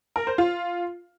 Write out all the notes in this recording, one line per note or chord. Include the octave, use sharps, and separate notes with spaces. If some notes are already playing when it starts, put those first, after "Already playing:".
A#4
C5
F4